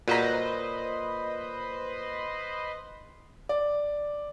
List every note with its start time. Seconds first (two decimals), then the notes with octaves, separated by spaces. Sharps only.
0.08 A#2 F#4 B4 C5 D#5 A#5
3.49 D5